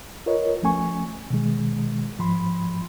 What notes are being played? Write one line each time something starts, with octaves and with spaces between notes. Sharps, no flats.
F4 A#4 B4 C#5 D#5
C#2 F3 A3 C#4 G#5 C#6
B2 D#3 G#3
G#2 F3 B5 C6